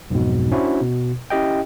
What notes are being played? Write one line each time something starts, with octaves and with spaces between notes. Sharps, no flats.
B1 F2 G#2 B2
C#4 D4 E4 F#4 C5
B2
C#4 E4 G4 D#5 G5